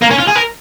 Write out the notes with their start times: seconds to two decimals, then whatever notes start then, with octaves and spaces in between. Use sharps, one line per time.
0.02 A#3
0.10 C#4
0.19 F4
0.28 G#4
0.36 A#4